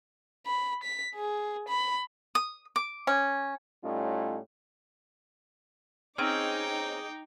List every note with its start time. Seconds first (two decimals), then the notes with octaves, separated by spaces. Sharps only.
0.46 B5
0.83 B6
1.14 G#4
1.68 B5
2.35 D#6
2.76 D6
3.07 C#4
3.83 A2 G3 C#4 D#4 F4
6.18 C4 C#4 D#4 G#4 G5 D6